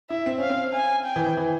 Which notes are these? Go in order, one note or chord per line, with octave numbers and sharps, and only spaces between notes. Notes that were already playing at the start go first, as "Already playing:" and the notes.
E4 E5
C4
C#4 F5
C4
G#5
G5
E3
E3
E3